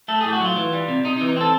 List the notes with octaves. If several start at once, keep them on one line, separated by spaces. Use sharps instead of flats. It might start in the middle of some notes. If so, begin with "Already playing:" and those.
A3 A4
G#4
A2 G4
F#4
F#3 F4
E3
G3
C3
C3 D#4
D#4
E3
D#4
C4 A4